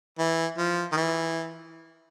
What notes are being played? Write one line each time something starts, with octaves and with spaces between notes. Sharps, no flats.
E3
F3
D#3
E3